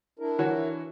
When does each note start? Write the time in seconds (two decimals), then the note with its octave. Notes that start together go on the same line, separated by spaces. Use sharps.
0.19 D4 E4 A#4
0.39 E3 F#4 C#5